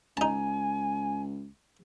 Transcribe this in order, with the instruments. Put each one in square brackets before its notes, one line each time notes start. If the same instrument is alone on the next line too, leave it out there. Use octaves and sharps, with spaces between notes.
[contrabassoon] C#2 [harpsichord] D#4 A5 [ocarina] G#5